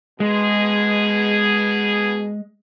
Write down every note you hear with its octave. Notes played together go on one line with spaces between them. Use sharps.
B2 G#3 B3 G#4